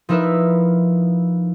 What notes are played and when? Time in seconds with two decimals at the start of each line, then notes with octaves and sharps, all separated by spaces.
0.09 F3 D#4 E4 A#4 B4 E5